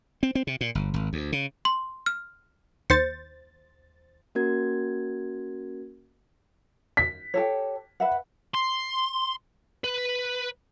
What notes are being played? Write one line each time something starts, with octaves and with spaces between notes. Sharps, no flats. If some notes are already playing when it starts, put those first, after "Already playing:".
C4
C4
C3
A#2
G1
G#1
D2
C#3
C6
F6
D#2 C5 G6 A6 C#7
A#3 C#4 F#4 A#4 G#6
B6
G4 A4 C#5
B4 E5 F#5
C6
B4